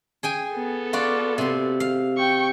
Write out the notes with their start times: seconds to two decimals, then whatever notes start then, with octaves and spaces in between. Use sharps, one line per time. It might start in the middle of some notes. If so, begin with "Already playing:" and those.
0.23 G#4 G5 G#5
0.55 B3 A4
0.93 F4 F#4 D5
1.38 C3 C6
1.80 F5
2.17 G5 C#6